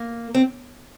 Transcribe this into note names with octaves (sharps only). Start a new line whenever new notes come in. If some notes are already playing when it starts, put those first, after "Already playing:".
Already playing: A#3
C4